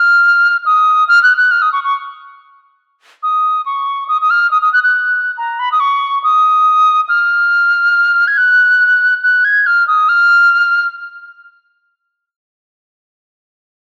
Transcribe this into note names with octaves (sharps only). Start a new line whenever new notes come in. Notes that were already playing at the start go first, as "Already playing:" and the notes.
Already playing: F6
D#6
F6
F#6
F#6
F6
D#6
C#6
C#6
D#6
C#6
D#6
D#6
F6
D#6
D#6
F#6
F#6
A#5
B5
D#6
C#6
D#6
F6
G#6
F#6
F#6
G#6
F6
D#6
F6